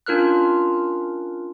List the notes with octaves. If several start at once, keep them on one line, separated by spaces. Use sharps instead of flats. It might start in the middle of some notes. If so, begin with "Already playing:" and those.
C#4 D4 F4 A#4 F6 F#6